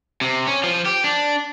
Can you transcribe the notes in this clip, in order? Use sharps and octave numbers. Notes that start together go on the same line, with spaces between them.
C3
C#4
F3
G4
D4